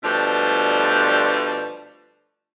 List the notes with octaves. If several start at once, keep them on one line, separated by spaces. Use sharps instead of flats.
B2 F3 G3 A3 D4 B4